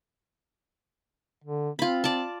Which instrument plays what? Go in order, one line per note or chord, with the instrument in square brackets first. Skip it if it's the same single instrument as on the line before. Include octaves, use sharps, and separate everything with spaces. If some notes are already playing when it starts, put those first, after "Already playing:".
[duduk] D3
[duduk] C4 [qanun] F4 B5
[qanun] D5 A5